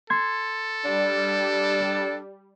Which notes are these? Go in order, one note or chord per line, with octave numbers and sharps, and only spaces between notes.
A4 C6 G#6
G3 D4